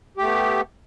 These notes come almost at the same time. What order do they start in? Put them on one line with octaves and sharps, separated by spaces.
G4 A3 B3